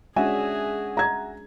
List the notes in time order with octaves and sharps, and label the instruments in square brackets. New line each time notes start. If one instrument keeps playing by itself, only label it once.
[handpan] G#3 C#4 D4 [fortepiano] F#4 E5 G#5 [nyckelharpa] G#4
[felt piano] A#5 G#6